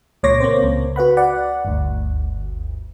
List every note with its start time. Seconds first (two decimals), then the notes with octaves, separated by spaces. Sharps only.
0.23 C#2 A#2 C#5 C6 D6 A#6
0.40 A#3 C4 C5
0.63 C#2
0.96 F#4 B4 F#5 B5
1.17 D5 F#5
1.65 G1 D2